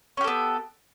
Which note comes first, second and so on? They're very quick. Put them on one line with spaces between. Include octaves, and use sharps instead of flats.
C#4 G4 A4 B3